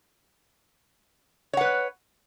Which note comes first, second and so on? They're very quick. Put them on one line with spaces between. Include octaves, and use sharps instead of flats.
C#5 F#5 B4